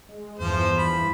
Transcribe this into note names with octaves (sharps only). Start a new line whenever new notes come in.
G#3
E2 G2 E3 F3 C5
B5